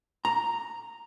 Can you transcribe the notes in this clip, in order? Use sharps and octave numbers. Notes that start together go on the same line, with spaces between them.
A#5